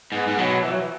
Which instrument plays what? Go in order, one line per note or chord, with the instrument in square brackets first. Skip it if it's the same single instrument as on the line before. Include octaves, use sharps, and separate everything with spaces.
[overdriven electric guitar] G#2 [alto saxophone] B3
[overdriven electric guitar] G#2
[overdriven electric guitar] B2 [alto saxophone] F#3
[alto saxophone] E3
F#3
E3